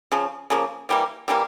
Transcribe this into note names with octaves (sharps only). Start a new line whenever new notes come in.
C#3 F3
C#3 F3 A#3
C3 E3 G3 A#3
C3 E3 G3 A#3